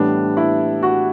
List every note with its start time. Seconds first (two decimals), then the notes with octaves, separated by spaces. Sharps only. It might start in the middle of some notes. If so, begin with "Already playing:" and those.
Already playing: A2 E3 G3 B3 D4
0.37 E4
0.83 F#4